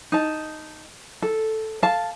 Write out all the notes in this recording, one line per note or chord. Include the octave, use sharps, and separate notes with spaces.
D#4 A5
A4
F5 A5